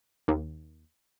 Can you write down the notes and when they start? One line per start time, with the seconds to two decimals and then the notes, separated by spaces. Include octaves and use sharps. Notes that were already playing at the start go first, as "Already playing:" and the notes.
0.28 D#2